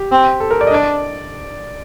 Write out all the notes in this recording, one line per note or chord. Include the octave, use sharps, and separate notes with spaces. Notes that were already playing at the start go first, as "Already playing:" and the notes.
Already playing: G4
C4
A4
A#4
D5
D#5
D4 D5